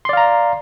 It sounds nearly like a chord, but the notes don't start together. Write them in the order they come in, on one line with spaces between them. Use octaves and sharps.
C6 D5 F5 A#5